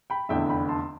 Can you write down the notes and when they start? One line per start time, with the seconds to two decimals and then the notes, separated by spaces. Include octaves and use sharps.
0.10 G5 B5
0.29 F1 E2 D3 E5 G5
0.49 G5 B5
0.69 A5 C6